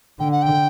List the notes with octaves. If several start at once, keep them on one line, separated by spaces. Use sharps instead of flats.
D3 G5
F#5
G5